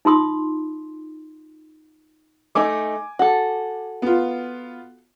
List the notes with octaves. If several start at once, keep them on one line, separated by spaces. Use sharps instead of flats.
D#4 F4 C6 D#6
A3 D#4 G#5 D6
F#4 A4
B3 F4